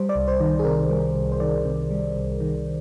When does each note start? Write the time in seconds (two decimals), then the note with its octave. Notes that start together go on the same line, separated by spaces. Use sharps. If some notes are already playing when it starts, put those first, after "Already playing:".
Already playing: G3 C5
0.09 D5
0.16 C2
0.28 C5
0.40 D#3
0.59 G#4
0.65 C3 A#4
0.90 G3
1.15 C2
1.32 C5
1.40 D#3 D5
1.65 C3
1.90 G3
2.16 C2
2.40 D#3